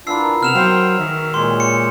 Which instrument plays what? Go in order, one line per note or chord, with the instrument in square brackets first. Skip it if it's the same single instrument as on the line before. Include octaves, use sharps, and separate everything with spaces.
[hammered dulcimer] E3 B3 A#4 [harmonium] D4 F4 [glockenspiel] E6 C7
[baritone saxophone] C3 [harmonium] B3 [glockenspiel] F6 E7 F7
[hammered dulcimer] D#3 [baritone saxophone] F#3 [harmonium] C5 F5 G5
[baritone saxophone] D#3 [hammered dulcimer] F#4 G#4 D#5 [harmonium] A#4 E5
[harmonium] A#2 G#3 [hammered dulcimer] G4 C#5 [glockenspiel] C6
[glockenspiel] C#7